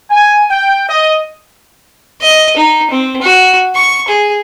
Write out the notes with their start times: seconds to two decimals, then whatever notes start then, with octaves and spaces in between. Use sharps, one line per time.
0.10 G#5
0.50 G5
0.89 D#5
2.21 D#5
2.57 D#4
2.90 C4
3.22 F#4
3.76 C#6
4.08 G#4